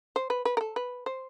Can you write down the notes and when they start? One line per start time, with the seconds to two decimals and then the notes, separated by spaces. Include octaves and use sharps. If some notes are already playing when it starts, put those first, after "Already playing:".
0.16 C5
0.30 B4
0.45 B4
0.57 A#4
0.61 A4
0.76 B4
1.06 C5